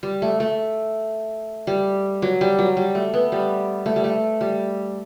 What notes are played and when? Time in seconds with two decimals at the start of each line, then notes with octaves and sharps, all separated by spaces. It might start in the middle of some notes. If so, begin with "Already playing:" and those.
0.03 G3
0.22 A3
0.40 A3
1.67 G3
2.22 F#3
2.41 G3
2.59 F#3
2.77 G3
2.95 A3
3.14 B3
3.32 G3
3.86 A3
3.96 G3
4.04 A3
4.41 G3